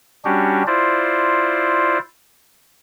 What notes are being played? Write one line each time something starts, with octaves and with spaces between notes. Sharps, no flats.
G3 C#4 D4 F#4 G4
E4 F4 C5 D5